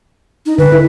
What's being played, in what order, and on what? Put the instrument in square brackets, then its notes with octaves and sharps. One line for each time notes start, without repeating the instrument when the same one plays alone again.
[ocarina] D#4
[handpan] D3 [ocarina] B4
[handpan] E4